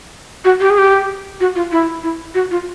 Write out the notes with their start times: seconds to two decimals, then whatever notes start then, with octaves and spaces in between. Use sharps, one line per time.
0.45 F#4
0.60 G4
0.70 G#4
0.78 G4
1.40 F#4
1.56 F4
1.72 E4
2.03 E4
2.35 F#4
2.51 F4